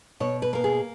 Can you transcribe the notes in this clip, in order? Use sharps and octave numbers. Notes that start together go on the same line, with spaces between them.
B2 C#5
B4
A#3 A#4
G#4